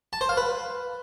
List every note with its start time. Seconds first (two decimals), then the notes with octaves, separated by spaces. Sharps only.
0.13 A5
0.21 C5
0.29 F5
0.37 B4